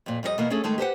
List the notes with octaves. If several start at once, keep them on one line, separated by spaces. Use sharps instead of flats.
F2 A#2
F2 G3 A4 D#5
B2 E3 A#3 B3
A3 C#4 D4 G#4 A4
D#3 G#3 A3 D#4 A5
G4 B4 C5 F#5